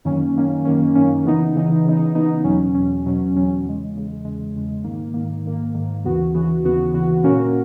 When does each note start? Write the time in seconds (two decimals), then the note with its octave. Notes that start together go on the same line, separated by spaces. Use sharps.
0.05 F#2 D#3 A#3 C#4
0.36 F#2 D#3 A#3 C#4
0.65 F#2 D#3 A#3 C#4
0.95 F#2 D#3 A#3 C#4
1.25 C#3 E3 B3 D#4
1.55 C#3 E3 B3 D#4
1.85 C#3 E3 B3 D#4
2.15 C#3 E3 B3 D#4
2.44 E2 B2 F#3 C#4
2.74 E2 B2 F#3 C#4
3.05 E2 B2 F#3 C#4
3.34 E2 B2 F#3 C#4
3.64 E2 C#3 G#3
3.94 E2 C#3 G#3
4.25 E2 C#3 G#3
4.55 E2 C#3 G#3
4.84 G#2 D#3 A#3
5.14 G#2 D#3 A#3
5.45 G#2 D#3 A#3
5.74 G#2 D#3 A#3
6.04 D#2 C#3 E3 B3 F#4
6.34 D#2 C#3 E3 B3 F#4
6.64 D#2 C#3 E3 B3 F#4
6.93 D#2 C#3 E3 B3 F#4
7.24 A#2 A#3 C#4 F#4 A#4